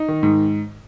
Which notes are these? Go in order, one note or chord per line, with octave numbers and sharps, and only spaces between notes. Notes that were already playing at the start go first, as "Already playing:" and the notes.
Already playing: D#4
D#3
G#2